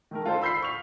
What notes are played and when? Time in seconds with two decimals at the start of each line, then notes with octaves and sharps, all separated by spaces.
0.11 D#3 A3 A#4
0.26 F4 A4 C5
0.42 B5 E6 G6 B6 C7
0.63 C#6 F6 F7